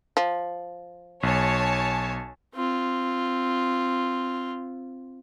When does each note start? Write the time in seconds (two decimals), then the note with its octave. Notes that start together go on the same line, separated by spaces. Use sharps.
0.17 F3
1.23 B1 C#5 G#5 A5
2.55 C4 F4